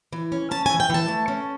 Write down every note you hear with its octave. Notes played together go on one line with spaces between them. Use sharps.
E3
C#4
C#4 A5
E3 G#5
G5
E3 A5
A3
C#4